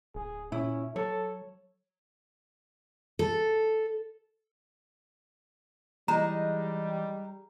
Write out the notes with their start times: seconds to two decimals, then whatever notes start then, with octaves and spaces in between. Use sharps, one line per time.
0.15 D1 G#4
0.52 A#2 C#4 E4
0.96 F#3 A4 C#5
3.19 A4
6.08 E3 G3 G#3 D#4 A#5